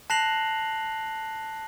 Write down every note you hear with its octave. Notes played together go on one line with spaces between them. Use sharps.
A5 F#6 A#6 C7 F7 F#7